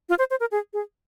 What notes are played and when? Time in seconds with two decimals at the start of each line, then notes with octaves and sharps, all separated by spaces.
0.09 F4
0.19 C5
0.31 C5
0.40 A#4
0.52 G#4
0.73 G#4